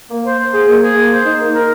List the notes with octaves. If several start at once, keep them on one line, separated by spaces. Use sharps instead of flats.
A#3
C5
C5
G#4
A#3
G#4
A#3
C5
D#4
A#3
A#4